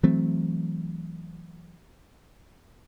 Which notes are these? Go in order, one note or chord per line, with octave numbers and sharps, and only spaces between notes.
E3 F#3 A3 C4